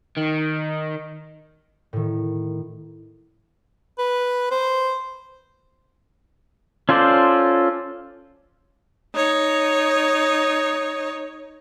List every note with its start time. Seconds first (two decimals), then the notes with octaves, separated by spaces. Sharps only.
0.17 D#3
1.93 A2 D#3
3.99 B4
4.51 C5
6.89 C#4 F4 A4 C5 D5
9.15 D#4 C#5